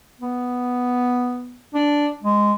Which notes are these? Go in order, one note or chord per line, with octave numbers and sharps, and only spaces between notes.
B3
D4
G#3